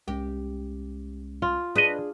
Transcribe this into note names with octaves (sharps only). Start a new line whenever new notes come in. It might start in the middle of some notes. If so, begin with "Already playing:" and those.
C2 G#3 C#4 G4
F4
D4 G#4 B4 D#5